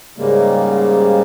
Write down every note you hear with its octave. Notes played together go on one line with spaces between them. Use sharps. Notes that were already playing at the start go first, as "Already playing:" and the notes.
G#2 C#3 G3 G#3 A#3